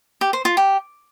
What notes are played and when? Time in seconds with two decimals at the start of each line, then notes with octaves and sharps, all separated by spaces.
0.21 G4
0.33 C5
0.45 F4
0.57 G4